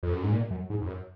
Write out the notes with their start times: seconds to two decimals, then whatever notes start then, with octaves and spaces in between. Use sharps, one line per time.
0.03 F2
0.13 F#2
0.23 G#2
0.32 A#2
0.50 F#2
0.70 G#2
0.81 F2
0.87 F#2